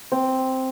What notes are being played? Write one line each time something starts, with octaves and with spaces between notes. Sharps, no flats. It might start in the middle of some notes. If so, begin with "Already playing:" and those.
C4